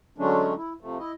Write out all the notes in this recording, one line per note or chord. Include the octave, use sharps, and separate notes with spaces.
D3 F#3 G#3 A3 C#4 D4
E4
C3 F3 A3
E4 D#5